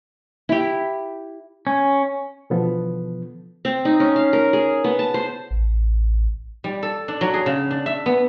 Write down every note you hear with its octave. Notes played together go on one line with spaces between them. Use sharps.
E4 G4
C#4
B2 D3 E3 F3 B3 A4
C4
D#4
C#4
F5
A#4
G#4
B3
A5
C5
A1
G3
A4
D4
F#3
G#4
C#3
D4
E5
B3